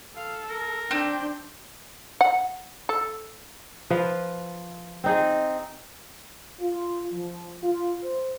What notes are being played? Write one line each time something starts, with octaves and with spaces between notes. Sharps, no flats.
A4 F5
A#4
C4 D4 G5
F#5
A4
F3 B4 F5
C4 D#4 G#4
F4
F3
F4
C5